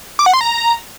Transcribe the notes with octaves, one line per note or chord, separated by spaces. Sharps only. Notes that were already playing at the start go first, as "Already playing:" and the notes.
D6
F#5
C6
A#5